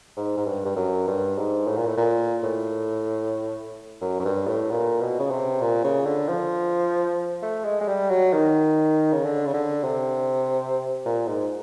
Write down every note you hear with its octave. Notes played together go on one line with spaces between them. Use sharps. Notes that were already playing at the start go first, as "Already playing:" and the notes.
G#2
G#2
G2
G2
F#2
G2
G#2
A2
A#2
A2
A#2
A2
F#2
F#2
G2
A2
A#2
B2
C#3
C3
A#2
C#3
D3
F3
A3
G#3
G#3
G3
F#3
D#3
C#3
D3
C#3
D3
C3
A#2
G#2